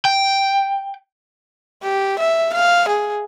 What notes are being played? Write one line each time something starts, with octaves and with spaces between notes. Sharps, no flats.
G5
G4
E5
F5
G#4